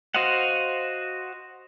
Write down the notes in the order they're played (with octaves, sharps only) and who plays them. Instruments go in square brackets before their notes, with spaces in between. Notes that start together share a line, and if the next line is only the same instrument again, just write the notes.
[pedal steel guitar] F#4 C5 D#5 F5 F#5